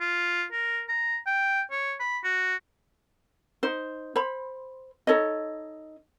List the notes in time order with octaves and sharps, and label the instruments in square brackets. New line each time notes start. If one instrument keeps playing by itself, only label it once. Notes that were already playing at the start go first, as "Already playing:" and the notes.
[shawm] F4
A#4
A#5
G5
C#5
B5
F#4
[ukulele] D#4 C5
C5 B5
D#4 A4 C#5 D#5